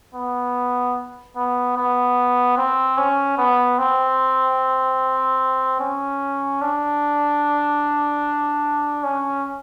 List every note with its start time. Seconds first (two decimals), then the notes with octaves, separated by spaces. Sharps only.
0.15 B3
1.36 B3
1.77 B3
2.57 C4
2.98 C#4
3.38 B3
3.78 C4
5.80 C#4
6.61 D4
9.04 C#4